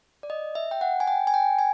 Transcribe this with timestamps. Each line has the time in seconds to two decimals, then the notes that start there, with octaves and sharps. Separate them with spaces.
0.23 D5
0.30 D#5
0.55 E5
0.71 G5
0.81 F#5
1.00 G#5
1.07 G5
1.27 G#5
1.34 G5
1.59 G#5